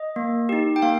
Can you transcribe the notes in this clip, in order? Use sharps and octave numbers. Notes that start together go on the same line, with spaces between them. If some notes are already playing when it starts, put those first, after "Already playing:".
Already playing: D#5
A#3
D#4 G4
G5
A#3 F5